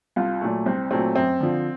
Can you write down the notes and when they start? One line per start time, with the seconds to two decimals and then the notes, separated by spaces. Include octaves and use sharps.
0.16 C2 F4
0.41 A#2 F#3 A3
0.66 C2 C4
0.91 A#2 F#3 A3 C4
1.15 F#2 C4
1.40 D3 F3